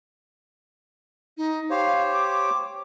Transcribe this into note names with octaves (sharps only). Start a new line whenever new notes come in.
D#4
G4 C5 C#5 F5
D6